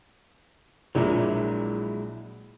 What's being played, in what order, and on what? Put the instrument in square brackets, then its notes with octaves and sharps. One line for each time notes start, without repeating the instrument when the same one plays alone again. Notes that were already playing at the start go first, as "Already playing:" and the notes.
[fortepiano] A#1 A#2 [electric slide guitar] F#3 G#3 E4